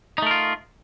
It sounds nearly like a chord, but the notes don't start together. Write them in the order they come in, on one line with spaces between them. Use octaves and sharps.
D#4 A3 A#4 F4